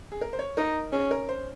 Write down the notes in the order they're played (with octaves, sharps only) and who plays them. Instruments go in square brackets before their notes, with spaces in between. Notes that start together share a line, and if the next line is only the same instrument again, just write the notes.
[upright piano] G#4
A#4
C5
C#5
[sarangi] D#4 [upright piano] A#4
[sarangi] C#4 [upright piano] G#4
[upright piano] A#4
C5